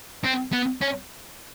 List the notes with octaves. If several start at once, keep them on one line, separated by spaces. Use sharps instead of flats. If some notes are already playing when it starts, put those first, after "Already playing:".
C4
B3
C#4